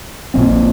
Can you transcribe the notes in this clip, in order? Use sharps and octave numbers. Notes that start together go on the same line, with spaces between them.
A#1 A#2 G3 C4